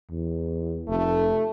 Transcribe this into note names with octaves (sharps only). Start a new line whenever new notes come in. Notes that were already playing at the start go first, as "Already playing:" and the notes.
E2
F1 A3